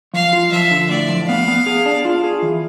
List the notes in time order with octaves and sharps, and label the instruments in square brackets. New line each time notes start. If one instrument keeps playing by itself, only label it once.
[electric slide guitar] F3 [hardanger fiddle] F5
[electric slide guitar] F4
[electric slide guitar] F3 [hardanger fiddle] E5
[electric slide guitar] D3
[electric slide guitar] A2 [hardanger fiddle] D5
[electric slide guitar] F3
[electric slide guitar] B3 [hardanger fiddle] F5
[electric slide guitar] B3
G#4
D4
F4
G#4
E3